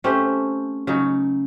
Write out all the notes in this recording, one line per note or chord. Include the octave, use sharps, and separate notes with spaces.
A3 C4 C#4 G4
C#3 F#3 D#4